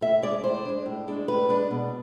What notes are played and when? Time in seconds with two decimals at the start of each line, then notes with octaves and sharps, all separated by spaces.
0.01 A2 E5
0.22 G#3 D4 D5
0.44 A2 C5
0.65 G#3 D4
0.86 A2
1.08 G#3 D4
1.28 A2 B4
1.49 G#3 D4
1.71 B2